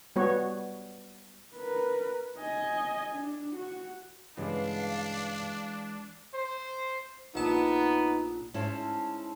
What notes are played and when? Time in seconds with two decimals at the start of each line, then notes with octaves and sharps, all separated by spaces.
0.16 G3 B3 F#4 C#5
1.55 A#4 B4
2.38 D#5 G#5
3.15 D4
3.55 F#4
4.37 G2 C#3 E3 G#3 B3 D4 F5
6.34 C5
7.35 A#1 B3 D#4 A5
8.54 G#2 C#4 E4 C5 A5